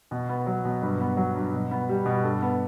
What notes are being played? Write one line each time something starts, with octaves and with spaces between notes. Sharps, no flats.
B2
B3
F#3
B2
G2 B4
B3
F#3
G2
B2
B3
G3
B2
G2 A4
B3